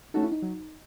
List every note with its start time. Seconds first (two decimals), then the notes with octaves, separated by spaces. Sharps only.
0.14 A3 C#4 D#4 F#4 A4
0.23 E4
0.32 D#4
0.42 F#3